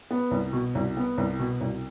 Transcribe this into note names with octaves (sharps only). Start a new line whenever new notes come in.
B3
C2
B2
C2
B3
C2
B2
C2